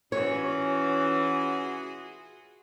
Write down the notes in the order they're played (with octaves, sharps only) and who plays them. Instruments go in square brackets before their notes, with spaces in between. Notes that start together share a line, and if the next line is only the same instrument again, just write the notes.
[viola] E3 [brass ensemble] C#4 [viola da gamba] F4 F#4 G#4 [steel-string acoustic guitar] C#5